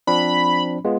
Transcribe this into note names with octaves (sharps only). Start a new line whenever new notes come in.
F3 C4 D4 B5
G#3 B3 F4